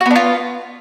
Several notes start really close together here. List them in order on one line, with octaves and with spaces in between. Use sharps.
F#4 B3 D4 F4